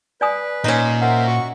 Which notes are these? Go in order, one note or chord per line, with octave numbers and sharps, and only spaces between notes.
B4 D5 G#5 D#6
A#2 C#4 D#4
A#4 C5 E5 F#5
F#4 C#6